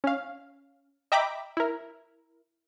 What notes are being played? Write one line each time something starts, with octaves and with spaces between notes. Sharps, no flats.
C#4 F5
D#5 E5 G5 A#5 B5 D6
E4 A#4